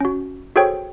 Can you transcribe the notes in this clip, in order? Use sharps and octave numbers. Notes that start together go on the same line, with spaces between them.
C#4 F#4
F#4 G#4 A4 C5 C#5 G5